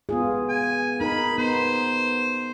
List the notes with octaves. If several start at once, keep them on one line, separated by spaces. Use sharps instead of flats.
B3 F4 G#4
G#5
D#4 A#4 B5
B3 C5